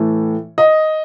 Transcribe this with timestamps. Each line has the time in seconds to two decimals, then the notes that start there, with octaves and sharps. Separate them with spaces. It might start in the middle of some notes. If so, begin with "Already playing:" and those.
Already playing: A2 E3 A3
0.58 D#5